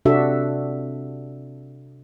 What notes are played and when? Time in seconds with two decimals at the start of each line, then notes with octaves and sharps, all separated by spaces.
0.05 C3 D4 F#4 A4 E5